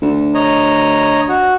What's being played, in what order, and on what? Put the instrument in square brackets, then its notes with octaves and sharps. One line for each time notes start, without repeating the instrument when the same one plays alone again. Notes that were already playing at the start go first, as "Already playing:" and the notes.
[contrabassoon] D2
[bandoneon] C#5 D#5 A#5
F#4